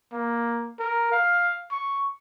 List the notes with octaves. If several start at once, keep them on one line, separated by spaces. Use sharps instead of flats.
A#3
A#4
F5
C#6